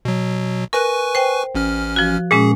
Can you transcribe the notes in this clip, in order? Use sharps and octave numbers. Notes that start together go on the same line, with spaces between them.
B2 F#3
A#4 B4 G#5 C#6 F#6
C5 G5
A1 C#4 F6
F3 F#4
A#2 G#3 C#4 G#4